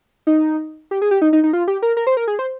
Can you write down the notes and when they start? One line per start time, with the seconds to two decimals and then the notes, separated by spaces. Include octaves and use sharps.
0.27 D#4
0.91 G4
1.02 G#4
1.11 G4
1.22 D#4
1.33 D#4
1.44 D#4
1.53 F4
1.68 G4
1.82 A#4
1.97 A#4
2.07 C5
2.17 A#4
2.28 G#4
2.39 C5